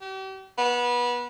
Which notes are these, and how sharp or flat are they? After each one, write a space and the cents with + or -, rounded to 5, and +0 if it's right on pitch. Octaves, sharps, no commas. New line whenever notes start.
G4 -40
B3 -25